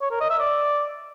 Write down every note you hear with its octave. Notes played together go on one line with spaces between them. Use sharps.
C#5
A#4
D#5
E5
D5